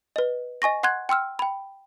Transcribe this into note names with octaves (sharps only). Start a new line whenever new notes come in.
B4 D#5
D#5 G#5 C#6 A#6
F#5 C6 F#6 G#6
G5 C6 E6 F6
G5 B5